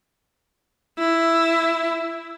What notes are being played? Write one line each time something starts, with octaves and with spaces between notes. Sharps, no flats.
E4